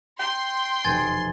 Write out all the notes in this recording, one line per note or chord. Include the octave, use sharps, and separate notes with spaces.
G5 C6
F1 E2 B2 G#5 G#6 A6